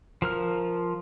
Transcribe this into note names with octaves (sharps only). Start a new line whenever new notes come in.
F3 A#4 F6